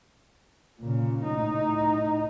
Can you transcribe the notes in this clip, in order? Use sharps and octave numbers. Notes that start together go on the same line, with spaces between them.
A#2 C#3
A2 D#4